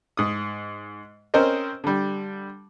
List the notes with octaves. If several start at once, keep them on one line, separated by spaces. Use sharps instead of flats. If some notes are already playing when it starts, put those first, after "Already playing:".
G#2 D#6
C4 C#4 A#4 C5 D#5
D3 G3